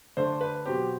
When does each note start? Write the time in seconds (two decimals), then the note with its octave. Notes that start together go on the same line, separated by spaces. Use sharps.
0.17 D3 A3 D4 C5
0.41 B4
0.65 B2 F#3 C4 G4